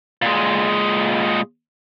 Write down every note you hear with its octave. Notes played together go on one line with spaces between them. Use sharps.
A#2 G#3